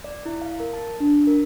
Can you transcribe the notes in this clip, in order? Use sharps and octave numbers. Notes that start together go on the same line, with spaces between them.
D5
E4
F5
A#4
A5
D4
A#4